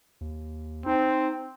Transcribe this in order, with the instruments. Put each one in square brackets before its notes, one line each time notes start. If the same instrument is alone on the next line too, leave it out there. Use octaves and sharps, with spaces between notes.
[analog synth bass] D#2
[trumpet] C4 [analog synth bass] D#4